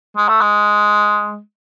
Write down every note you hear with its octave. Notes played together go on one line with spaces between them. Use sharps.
G#3
A3
G#3